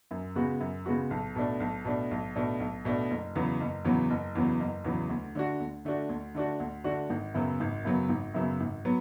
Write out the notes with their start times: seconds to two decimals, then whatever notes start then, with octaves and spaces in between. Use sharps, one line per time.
0.11 F#2
0.36 C#3 G#3 B3 F#4
0.60 F#2
0.86 C#3 G#3 B3 F#4
1.11 B1
1.36 B2 A3 D4
1.60 B1
1.85 B2 A3 D4
2.11 B1
2.36 B2 A3 D4
2.60 B1
2.85 B2 A3 D4
3.10 F#1
3.36 E2 C#3 F#3 B3
3.60 F#1
3.85 E2 C#3 F#3 B3
4.10 F#1
4.35 E2 C#3 F#3 B3
4.60 F#1
4.84 E2 C#3 F#3 B3
5.10 D2
5.35 D3 A3 D4 F#4
5.60 D2
5.85 D3 A3 D4 F#4
6.09 D2
6.35 D3 A3 D4 F#4
6.60 D2
6.84 D3 A3 D4 F#4
7.10 G#1
7.34 F#2 C#3 F#3 B3
7.60 G#1
7.85 F#2 C#3 F#3 B3
8.09 G#1
8.34 F#2 C#3 F#3 B3
8.60 G#1
8.85 F#3 B3